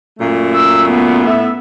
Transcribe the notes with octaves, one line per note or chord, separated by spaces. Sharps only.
F#2 A#2 A3
E6
B3
A2 E5